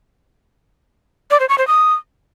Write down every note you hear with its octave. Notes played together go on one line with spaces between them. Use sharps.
D5
C5
C#6
C5
D#6